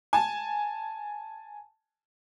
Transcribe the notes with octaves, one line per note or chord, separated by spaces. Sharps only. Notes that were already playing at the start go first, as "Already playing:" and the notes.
G#5 A5